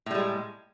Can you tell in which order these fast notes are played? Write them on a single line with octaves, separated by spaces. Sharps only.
A2 G3 G#3